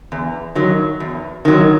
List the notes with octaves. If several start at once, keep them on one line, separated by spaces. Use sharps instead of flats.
E2
D#3 F#3
E2
D#3 F#3